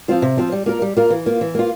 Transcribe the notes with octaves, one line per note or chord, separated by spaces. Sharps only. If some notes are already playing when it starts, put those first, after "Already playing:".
F3 C4 F4 C5
C3
F3 C4 F4 C5
G3
A#3 F4 A#4
G3
A#3 F4 A#4
E3
A#3 F4
E3
A#3 F4